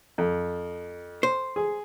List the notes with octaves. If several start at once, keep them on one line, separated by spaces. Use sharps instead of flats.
F2
C5
G#4